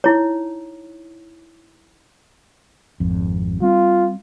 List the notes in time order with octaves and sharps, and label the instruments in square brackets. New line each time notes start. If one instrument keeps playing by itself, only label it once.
[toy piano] D#4 E4 C#5
[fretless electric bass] G#1 F2
[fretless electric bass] G3 C4 [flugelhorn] F4